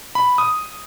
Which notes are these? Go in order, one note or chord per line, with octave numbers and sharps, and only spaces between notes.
B5
D#6